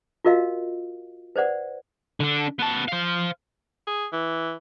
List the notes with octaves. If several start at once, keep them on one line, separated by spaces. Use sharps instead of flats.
F4 F#4 A#4 D#5 F5
B4 C5 D5 F#5
D3 D4
B3 A5
C5 F5
G#4
E3